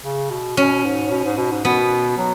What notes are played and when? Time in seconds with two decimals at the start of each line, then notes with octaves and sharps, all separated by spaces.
0.04 C#3
0.31 B2
0.57 B2 C#4
0.84 G#2
1.11 B2
1.25 G#2
1.38 B2
1.52 G#2
1.65 B2 B3
2.18 F#3